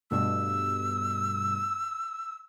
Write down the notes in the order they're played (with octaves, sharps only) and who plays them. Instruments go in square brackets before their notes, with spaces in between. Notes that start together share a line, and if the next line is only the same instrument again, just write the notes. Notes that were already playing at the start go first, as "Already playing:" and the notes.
[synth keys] G2 B2 A3 [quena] E6